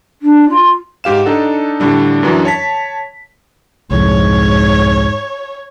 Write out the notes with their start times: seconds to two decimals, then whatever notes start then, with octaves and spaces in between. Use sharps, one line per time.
0.21 D4
0.49 F4
1.04 G#2 G4 F5 E7
1.25 D4 D#4 A4 F#5
1.80 A2 D3 G3 D4
2.23 F#2 E3 F#3 D4
2.45 C#5 A5 B6
3.91 C2 F2 G#2 C#5